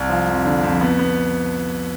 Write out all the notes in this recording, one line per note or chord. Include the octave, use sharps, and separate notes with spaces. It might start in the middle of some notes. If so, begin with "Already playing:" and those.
Already playing: C2
F3
F2
D3
F2
B3
B3